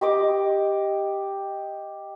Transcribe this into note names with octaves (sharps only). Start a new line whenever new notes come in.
G4 D#5 D6